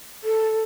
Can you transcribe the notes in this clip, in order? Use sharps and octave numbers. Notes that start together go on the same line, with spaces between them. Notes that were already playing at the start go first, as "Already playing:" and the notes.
A4